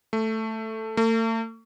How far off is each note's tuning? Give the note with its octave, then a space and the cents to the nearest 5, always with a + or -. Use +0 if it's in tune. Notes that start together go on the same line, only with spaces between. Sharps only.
A3 +5
A3 +40